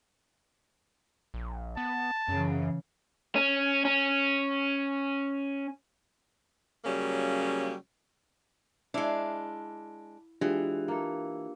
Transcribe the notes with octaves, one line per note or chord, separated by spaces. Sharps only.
A#1
B3 A5
F#2 C#3 E3
C#4
C#4
C#3 F#3 G3 A#3 C#4
G#3 D4 E4 E5 F5
E3 G#3 D4 F4 G4
A#3 A4